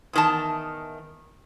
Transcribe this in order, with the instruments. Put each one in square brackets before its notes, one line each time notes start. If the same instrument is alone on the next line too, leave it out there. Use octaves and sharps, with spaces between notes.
[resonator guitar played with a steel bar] E2 D#3 A5